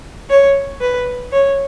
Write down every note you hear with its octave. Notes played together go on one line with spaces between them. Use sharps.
C#5
B4
C#5